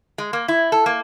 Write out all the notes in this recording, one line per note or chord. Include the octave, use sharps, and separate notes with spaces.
G#3
A#3
E4
A4
A#3